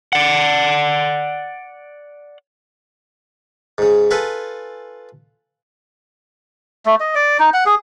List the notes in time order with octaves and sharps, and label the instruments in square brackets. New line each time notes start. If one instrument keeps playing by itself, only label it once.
[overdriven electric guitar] D5 F#5
[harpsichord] G#2 C#3
F4 A4 B4 G#5
[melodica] A3
D#5
D5
D#4
F#5
G#4